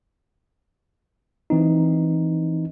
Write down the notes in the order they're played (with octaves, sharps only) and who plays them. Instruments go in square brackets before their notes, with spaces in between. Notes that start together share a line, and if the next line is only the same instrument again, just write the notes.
[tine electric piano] E3 C4 D#4